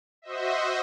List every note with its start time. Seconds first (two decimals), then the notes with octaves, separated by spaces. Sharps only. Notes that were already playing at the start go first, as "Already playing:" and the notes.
0.22 F#4 C5 D#5 E5